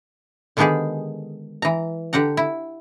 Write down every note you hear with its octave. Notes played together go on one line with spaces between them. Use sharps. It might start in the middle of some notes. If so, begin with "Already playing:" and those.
D3 D#3 G#3 B3 G4 G#4
E3 A#5
D3 G4 F#5 A#5
E4